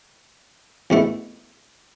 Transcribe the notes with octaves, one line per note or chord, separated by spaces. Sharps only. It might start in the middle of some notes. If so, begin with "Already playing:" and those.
E2 B2 A3 E4